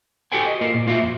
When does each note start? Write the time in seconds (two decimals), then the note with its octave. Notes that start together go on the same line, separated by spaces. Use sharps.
0.32 F#4 G4 A4 C5 G5 G#5
0.46 D#5
0.61 A#3 F4 A#4 C5
0.74 A#2
0.87 A#3 F4 F#4 C5 E5
1.02 F2